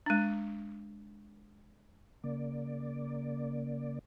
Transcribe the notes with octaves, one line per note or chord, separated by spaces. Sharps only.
G#3 D4
C#3 A#3 D5